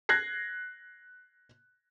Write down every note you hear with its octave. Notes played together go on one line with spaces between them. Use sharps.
F#6 G#6 A#6 C7